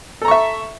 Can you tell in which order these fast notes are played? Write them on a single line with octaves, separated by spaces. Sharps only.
A4 A#5 C#6 E5